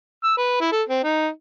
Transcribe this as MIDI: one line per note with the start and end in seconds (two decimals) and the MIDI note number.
0.24 0.34 88
0.37 0.56 71
0.60 0.67 64
0.72 0.82 69
0.88 1.01 60
1.03 1.28 63